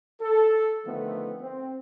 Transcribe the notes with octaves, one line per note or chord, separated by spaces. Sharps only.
A4
D3 D#3 F3 A3 B3 C4
C4